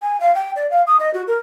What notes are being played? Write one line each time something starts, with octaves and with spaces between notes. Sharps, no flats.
G#5
F5
G5
D5
F5
D#6
D#5
F#4
A#4